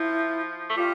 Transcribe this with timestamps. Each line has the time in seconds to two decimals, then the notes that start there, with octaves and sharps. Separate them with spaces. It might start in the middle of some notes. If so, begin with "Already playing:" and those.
Already playing: F3 E4
0.70 A3
0.76 G3 F4